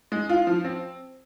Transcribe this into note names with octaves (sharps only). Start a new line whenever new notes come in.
G#3
F4
F3
C4